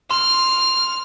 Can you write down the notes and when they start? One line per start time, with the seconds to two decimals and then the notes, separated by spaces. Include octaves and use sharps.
0.11 C6 F6